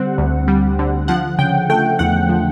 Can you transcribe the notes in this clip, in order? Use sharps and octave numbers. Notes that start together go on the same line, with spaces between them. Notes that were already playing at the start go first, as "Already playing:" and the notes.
Already playing: D3 G3 C4 F#5
D2
G3
D3
F3 F#5
C#3 G5
A3 G5
E2 F#5
F3